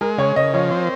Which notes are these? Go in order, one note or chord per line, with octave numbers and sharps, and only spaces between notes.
G#3 A#4
C#3 C#5
C#3 D#5
F3 C#5
C4